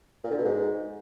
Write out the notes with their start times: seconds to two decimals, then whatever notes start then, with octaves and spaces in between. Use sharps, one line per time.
0.24 A#2
0.31 D3
0.38 B2
0.45 G#2